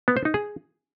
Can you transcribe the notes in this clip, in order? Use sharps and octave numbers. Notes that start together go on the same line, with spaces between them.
B3
C5
D#4
G#4